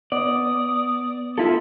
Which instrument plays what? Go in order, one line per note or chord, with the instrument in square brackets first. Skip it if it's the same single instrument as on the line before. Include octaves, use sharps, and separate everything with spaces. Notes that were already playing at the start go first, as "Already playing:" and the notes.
[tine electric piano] B3 [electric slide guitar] D5 [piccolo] D#6
[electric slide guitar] E4 A4 [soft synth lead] F4